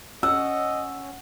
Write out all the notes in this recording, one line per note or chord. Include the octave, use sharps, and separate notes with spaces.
C#4 D#5 F#5 E6